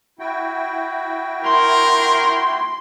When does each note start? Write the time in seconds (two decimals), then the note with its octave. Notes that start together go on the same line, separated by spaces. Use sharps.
0.19 E4 F#4 G5
1.44 A#4 C6